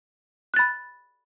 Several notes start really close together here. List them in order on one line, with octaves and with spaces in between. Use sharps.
F#6 A6 B5